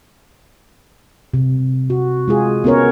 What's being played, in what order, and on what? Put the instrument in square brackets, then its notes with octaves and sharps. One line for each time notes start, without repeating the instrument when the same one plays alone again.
[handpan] C3
F#4
G#3 F4 G#4
B3 C#4 A#4 C#5